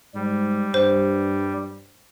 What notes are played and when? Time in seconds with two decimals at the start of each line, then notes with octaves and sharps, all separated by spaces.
0.15 G#2 G3
0.74 G2 C5